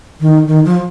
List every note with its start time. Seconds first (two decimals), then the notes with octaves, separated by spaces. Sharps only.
0.21 D#3
0.47 D#3
0.65 F3